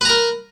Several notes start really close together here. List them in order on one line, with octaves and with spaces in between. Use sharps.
B4 A#5 A#4